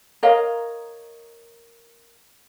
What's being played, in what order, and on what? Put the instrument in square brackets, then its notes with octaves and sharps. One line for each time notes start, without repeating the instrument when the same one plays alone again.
[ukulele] A#4 C#5 D#5 F5